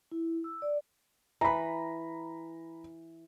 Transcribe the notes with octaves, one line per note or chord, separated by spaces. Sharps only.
E4
E6
D5
E3 B4 A#5 B5